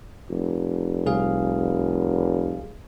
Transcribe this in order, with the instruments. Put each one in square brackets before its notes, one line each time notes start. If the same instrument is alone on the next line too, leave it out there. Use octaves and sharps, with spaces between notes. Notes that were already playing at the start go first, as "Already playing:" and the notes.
[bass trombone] F1
[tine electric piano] C2 G#4 F5